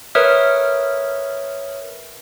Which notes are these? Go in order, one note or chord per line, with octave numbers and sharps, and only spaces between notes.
A#4 B4 C#5 E5 D#6 F6